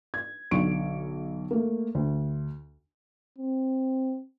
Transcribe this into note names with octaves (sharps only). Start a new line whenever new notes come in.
G#6
B1 D3 C#6 D7
A3 A#3
D2
C4